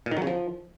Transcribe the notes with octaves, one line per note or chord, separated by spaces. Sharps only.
A#2
D#3
F#3
C#3
F3